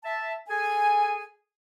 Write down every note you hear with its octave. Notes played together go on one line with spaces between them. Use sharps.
E5 A5
G#4 A4 G#5